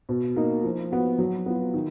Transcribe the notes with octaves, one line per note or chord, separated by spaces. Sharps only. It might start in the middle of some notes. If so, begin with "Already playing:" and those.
B2
A#3 D#4
F3
B3 F#4
F#3
B3 F4
D#3